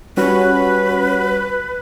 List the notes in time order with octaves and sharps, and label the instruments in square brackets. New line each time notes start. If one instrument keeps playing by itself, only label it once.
[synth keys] G3 C#4 F#4 [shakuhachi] B4